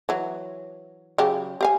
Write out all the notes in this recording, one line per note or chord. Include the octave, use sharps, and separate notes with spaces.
E3 F#3
C#3 F#3 G4
G4 F5 G#5